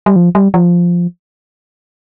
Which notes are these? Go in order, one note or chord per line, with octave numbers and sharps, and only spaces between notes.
G3
F3
G3
F3